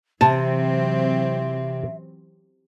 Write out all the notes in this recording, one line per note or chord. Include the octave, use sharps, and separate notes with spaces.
C3 E3 F#3 C4 E5 A5